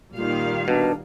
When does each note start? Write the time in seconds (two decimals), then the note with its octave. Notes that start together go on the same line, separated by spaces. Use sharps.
0.17 A#2 D#3 G3 F4 F5
0.68 B2 D4